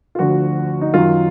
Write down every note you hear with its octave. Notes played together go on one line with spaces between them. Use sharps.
F4
D2 D3 F3 F#4
D#4
F#2 D#3 F#3 F4